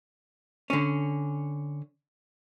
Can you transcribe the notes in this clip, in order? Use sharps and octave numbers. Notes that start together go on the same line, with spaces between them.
D3 C#4